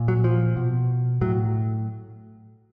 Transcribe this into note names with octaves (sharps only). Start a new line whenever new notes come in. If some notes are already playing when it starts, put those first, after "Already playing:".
Already playing: A#2
F#3
F3
B2
A2 F#3